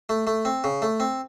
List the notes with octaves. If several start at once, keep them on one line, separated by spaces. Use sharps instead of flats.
A3
A3
C4
C#3
A3
C4